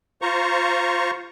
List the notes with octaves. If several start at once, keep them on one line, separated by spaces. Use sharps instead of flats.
F4 C5 A#5 C#6